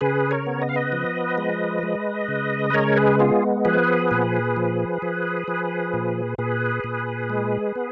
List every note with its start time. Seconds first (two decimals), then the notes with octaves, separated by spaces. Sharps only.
0.01 C#3 G#4 B4
0.31 A#4 C#5
0.47 B3
0.62 D#5
0.69 F5
0.76 B4 D#5
0.92 F3
1.38 G#3
1.83 G#3
2.28 C#3
2.70 B4
2.74 G#3 A#4 C#5
2.96 G#4 B4
3.19 B3 F4 G#4
3.65 F3 G#4 B4
4.11 A#2
4.56 F3
5.02 F3
5.48 F3
5.94 A#2
6.38 A#2 G#4 B4
6.84 A#2
7.30 G#3
7.75 B3